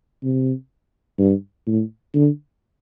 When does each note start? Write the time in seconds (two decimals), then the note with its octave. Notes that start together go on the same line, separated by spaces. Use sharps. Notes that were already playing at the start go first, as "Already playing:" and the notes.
0.23 C3
1.18 G2
1.67 A2
2.14 D3